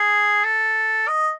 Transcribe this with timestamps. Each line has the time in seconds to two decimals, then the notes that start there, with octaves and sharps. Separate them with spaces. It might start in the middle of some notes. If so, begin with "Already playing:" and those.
Already playing: G#4
0.44 A4
1.08 D#5